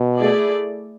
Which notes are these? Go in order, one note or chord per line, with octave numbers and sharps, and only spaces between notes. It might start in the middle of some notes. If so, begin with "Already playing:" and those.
Already playing: B2
A3 E4 G#4 D5